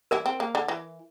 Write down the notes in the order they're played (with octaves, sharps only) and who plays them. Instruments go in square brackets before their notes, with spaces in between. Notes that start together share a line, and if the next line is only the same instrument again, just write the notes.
[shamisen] E3 E4 [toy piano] A#4
[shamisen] C4
A#3
D3
E3